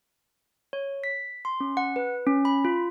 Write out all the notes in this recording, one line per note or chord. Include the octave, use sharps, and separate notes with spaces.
C#5
B6
C6
C#4
F#5
B4
C#4
B5
F4